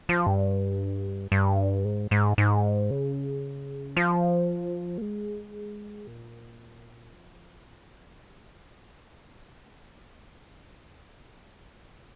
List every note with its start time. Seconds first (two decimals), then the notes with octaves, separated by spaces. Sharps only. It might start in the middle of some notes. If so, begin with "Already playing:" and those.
0.09 F3
0.27 G2
1.32 G2
1.85 G#2
2.11 G#2
2.38 G#2
2.91 C#3
3.97 F3
4.98 A#3
5.02 G#3
6.07 A#2
7.13 F3
8.19 G3